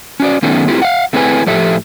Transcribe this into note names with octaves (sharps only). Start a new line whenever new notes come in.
C#4 F#4 D5
D#3 F#3 A3 B3 C#4 D#4
A3 C4 E4 F4 G4
F5 F#5
A3 C4 E4 G#4 B4 G#5
A2 F3 G4 A4 E5